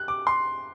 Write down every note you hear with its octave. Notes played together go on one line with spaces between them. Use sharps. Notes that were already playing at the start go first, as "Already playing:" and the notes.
Already playing: F#6
D6
C6